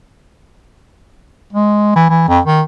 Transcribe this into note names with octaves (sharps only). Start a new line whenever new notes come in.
G#3
E3
E3
F2
D#3